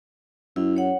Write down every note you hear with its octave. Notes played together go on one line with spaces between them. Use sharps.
F#2 E4
C#5 F#5